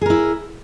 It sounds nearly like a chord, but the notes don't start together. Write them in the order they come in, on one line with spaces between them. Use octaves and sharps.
G#4 A#4 E4